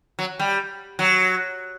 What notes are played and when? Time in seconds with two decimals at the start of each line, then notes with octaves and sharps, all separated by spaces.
0.19 F#3
0.39 G3
0.99 F#3